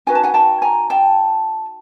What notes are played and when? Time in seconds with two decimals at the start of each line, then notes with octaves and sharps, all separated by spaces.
0.07 D#4 F#4 B4 G#5
0.15 A5
0.23 F#5 G#5
0.34 G5 A5
0.62 G#5 A#5
0.90 G5 A5